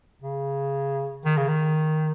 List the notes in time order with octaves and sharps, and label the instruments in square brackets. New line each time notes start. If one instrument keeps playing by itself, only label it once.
[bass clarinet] C#3
D#3
C#3
D#3